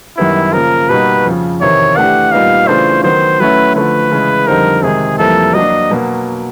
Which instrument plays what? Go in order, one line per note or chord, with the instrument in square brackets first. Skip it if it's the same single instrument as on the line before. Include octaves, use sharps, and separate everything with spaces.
[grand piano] F#2 D#3 G3 B3 [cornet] E4
[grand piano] C#3 F3 A#3 [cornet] A#4
[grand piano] B2 G3 A#3 D#4 F#4 [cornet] B4
[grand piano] F2 C#3 F3
[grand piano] E2 C3 D#3 [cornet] C#5
[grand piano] E3 A3 D4 G4 [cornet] F#5
[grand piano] A#2 G3 B3 D#4 [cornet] F5
[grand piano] C#3 E3 A3 D4 F4 [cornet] C5
[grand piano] D#3 F#3 B3 [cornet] C5
[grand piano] F#3 A3 C#4 E4 [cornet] B4
[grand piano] D3 F3 A3 [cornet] B4
[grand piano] C#3 E3 G#3
[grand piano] F2 D3 G3 C4 D#4 [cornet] A#4
[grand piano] C3 D#3 G#3 [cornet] G#4
[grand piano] F2 C3 E3 G3 A#3 [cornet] A4
[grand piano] F#3 A#3 D4 [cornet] D#5
[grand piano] B2 F#3 A#3